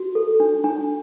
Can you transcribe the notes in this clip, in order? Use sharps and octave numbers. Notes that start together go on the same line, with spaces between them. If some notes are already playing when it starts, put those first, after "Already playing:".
Already playing: F#4
A4
D4
D4